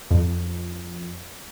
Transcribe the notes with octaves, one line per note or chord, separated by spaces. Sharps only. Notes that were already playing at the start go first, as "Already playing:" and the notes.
F2